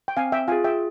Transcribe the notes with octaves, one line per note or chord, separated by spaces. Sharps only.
G5
C4 F5 G#5
E5 G5
F4 G#4 F5 G#5
E5 G5